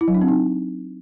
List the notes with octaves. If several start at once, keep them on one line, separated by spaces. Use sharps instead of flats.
E4
F#3
D4
C4
D#4